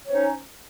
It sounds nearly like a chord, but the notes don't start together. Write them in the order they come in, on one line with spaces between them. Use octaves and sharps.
C#5 C4 C#4 D#4